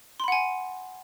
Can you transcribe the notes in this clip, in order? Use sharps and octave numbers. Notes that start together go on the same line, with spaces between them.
F#5 G#5 B5 C6